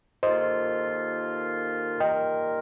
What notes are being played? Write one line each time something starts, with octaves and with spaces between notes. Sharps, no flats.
D#2 D#3 A#3 F4 A4 C5 D#5
D#3 G3 A#3 F4 A#4 D#5 G5